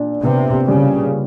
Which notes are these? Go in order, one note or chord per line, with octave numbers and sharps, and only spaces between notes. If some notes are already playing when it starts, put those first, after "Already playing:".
Already playing: A#2 D4
C3 B3
C#3 G3